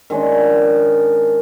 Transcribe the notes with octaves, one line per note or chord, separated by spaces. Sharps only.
D#3 G#3 C#4 D4